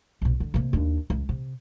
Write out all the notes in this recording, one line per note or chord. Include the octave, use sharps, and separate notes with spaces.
B1 C3
D3
C3 A#3
D#2 D4
C#2
C3